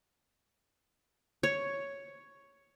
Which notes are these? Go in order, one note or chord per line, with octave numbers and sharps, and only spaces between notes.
C#5